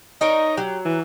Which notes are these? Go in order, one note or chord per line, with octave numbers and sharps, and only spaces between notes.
D#4 A#4 C#5 D#5
F#3 G4
E3